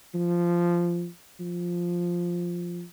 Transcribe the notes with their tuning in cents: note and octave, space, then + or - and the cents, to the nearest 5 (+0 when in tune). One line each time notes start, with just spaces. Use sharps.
F3 -10
F3 +0